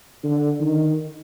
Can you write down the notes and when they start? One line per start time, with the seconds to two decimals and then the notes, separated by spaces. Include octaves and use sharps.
0.24 D3
0.60 D#3